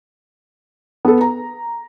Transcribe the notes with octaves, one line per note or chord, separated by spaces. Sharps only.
B3 A4
A#5